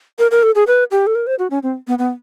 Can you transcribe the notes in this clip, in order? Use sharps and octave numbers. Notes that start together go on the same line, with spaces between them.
A#4
A#4
A4
G#4
B4
G4
A4
A#4
C5
F#4
C#4
C4
B3
B3